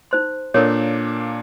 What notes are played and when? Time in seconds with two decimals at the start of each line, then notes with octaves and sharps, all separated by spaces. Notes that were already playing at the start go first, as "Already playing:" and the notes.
0.11 D#4 C5 C6
0.54 A#2 A#3 D4 A4 A#4 C#5